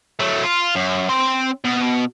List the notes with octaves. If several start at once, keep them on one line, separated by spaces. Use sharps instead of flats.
F#3 A3
F4
F#2
C4 C6
B2